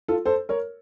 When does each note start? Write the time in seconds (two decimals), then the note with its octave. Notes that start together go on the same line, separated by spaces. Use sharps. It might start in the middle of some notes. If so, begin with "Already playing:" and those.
0.08 F4 A4
0.25 A4 C5
0.49 A#4 C#5